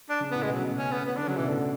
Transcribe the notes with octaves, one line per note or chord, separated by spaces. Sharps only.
D4
C#3
A2 B3
G#3
B2 F#3
C#3
B2
C#4
B3
B3
D3 D4
C#3 F#3
B2 E3
A2 D3